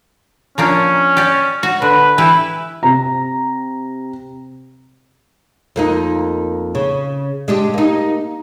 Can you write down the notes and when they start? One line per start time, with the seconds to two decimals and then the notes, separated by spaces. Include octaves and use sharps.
0.58 F3 A#3 C#4 D4
1.17 G4 D5
1.63 F#4
1.82 D3 B4
2.18 E3 E4 G4 B4
2.83 C3 A#5
5.76 F2 A#3 D#4
6.75 C#3
7.48 G#3 D4 G4
7.74 A#3 D#4